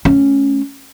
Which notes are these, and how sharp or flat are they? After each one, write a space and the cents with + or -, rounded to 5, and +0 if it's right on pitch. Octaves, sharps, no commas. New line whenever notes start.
A3 -25 C#4 +0